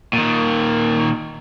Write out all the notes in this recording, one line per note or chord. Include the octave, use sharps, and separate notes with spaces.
A#2 D#3